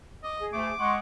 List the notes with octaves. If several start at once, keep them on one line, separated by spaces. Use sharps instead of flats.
D#5 D6
G#4
D2 A3 D6
G#3 F#5 C6 C#6